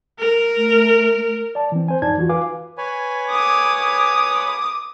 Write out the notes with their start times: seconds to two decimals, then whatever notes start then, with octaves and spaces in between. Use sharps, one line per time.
0.19 A#4
0.57 A3
1.55 D5 A5
1.72 E3 C4
1.88 C5 G#5
2.02 F2 G#2 D#4 D5 A5 G#6
2.17 E3 F4 F#4
2.29 B4 F5 G#5 D6
2.78 B4 C#5 G#5
3.29 D6 D#6